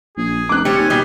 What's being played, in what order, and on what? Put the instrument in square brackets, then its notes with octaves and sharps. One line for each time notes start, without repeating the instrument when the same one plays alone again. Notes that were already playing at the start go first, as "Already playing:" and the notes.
[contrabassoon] A#1 [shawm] G#4
[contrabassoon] F1 [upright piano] D6 F#6
[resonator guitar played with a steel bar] G3 C4 [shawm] C#5
[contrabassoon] D#2 [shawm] G#5
[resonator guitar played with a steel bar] B2 G3